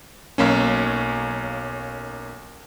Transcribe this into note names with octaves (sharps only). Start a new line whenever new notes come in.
B1 A#3 C#4